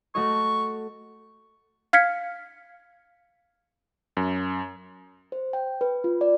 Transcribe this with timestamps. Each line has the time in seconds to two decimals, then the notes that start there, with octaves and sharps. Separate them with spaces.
0.15 A3 F#4 D#5 C#6
1.93 F5 F6 G#6 B6 C#7
4.17 F#2
5.32 C5
5.53 G5
5.81 B4
6.04 F4
6.21 D5